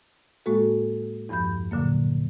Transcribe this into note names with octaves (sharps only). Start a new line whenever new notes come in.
A2 G#3 A#3 F#4 A4
E2 G2 F3 B5 G6
A#2 D3 F#3 A#3